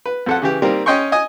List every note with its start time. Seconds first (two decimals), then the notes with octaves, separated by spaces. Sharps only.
0.06 B4
0.26 F2 A4 F#5
0.42 C#3 E3 G4
0.62 G3 A#3 C4 D#4 G4 A#4
0.86 C#4 D#5 G5 C6 C#6
1.12 D#5 G#5 D#6